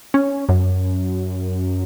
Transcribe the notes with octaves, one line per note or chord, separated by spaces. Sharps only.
C#4
F#2